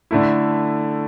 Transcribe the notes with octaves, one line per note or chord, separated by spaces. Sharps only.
D3 A3 E4